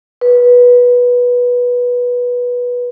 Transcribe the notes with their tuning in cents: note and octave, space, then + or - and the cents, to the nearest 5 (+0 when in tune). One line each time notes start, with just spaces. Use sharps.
B4 -15